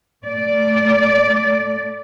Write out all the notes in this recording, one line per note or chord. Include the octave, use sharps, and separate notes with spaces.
A3 D5